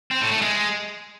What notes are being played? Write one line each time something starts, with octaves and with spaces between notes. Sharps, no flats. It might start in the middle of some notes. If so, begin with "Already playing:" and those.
C4
A2
A3
G#3